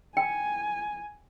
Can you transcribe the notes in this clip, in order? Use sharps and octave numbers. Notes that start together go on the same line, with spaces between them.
G5 G#5